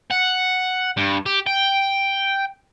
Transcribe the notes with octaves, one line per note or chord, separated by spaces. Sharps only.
F#5
G2
G4
G5